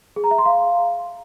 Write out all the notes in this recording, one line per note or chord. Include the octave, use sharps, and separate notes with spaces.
G#4
A#5
E5
C6
F5